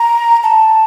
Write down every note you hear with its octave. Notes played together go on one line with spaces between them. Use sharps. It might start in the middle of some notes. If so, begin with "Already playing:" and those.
Already playing: A#5
A5